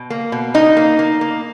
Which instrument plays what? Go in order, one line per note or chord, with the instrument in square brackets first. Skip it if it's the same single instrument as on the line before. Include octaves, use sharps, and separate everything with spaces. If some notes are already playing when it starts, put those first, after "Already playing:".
Already playing: [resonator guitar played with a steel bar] B2
A#3
B2
A#3 D#4
A#3
A#3
A#3